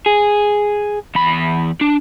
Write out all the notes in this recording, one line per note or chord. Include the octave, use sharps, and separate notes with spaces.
G#4
E2 B5
D4